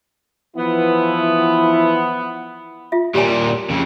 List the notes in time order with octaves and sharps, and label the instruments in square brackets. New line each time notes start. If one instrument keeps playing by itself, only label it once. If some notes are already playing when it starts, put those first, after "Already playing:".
[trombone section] E3 F3 E4 [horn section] B3
[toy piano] F4 E5
[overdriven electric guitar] A#2 G3 [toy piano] G4 C#5 G#5
[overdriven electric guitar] F2 C#3